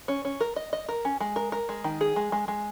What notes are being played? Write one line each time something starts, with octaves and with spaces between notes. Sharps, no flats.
C#4
C#4
A#4
D#5
D#5
A#4
C#4
G#3
A#4
A#4
G#3
D#3
G#4
G#3
G#3
G#3